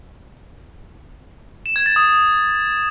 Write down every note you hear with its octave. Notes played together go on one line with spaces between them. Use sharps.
E7
G#6
A6
D#6